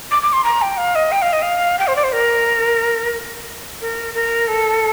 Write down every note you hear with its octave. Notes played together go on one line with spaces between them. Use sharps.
D6
D6
C6
A#5
G5
F5
D#5
G5
F5
D#5
F5
G5
C5
D5
C5
A#4
A#4
A#4
A4